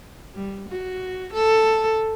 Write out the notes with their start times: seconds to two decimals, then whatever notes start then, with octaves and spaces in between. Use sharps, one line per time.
0.34 G3
0.69 F#4
1.33 A4